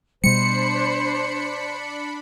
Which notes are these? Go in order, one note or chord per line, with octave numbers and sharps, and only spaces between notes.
B2 G3 D4 C5 B5 C#7